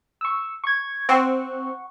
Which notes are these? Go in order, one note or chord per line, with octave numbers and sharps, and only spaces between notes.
C#6 E6
C#6 G#6
C4 F#5 C#6